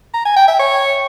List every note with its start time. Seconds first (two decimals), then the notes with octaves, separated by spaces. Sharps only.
0.14 A#5
0.25 G#5
0.37 G5
0.48 E5
0.59 C#5